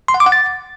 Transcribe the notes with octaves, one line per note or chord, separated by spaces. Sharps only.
C6
F#5
D6
F#5
A6